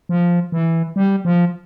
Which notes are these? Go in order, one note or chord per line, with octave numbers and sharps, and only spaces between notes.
F3
E3
G3
F3